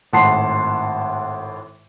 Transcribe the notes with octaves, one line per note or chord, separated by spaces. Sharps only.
G#1 A2 F#5 A5 C6 C7